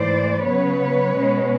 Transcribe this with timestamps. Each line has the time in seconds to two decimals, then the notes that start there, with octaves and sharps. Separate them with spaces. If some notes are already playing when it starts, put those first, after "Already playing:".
Already playing: G#2 E3 A3 C5 D5
0.43 C#3 F#3 B3 B4 C#5
1.14 B2 G#3 C#4